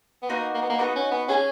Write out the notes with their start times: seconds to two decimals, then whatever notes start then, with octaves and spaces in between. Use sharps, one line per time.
0.22 B3
0.30 A#3 D#4 F#4 B4
0.54 A#3
0.62 B3
0.70 A#3
0.79 B3 D#4 F#4 B4
0.95 C#4
1.11 B3
1.28 C#4 G#4 C#5 G#5